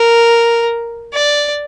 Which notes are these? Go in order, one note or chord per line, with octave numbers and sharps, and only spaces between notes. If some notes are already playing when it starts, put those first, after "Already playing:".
Already playing: A#4
D5